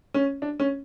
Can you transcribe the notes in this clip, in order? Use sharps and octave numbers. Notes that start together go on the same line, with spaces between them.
C#4
D4
C#4